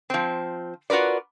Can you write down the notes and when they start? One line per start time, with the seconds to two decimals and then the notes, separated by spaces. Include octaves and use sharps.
0.10 F3 C4
0.90 F4 F#4 A#4 B4 D5